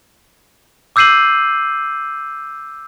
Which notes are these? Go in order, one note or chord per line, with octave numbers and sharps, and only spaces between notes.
D6 E6 G6 C7 D#7 F#7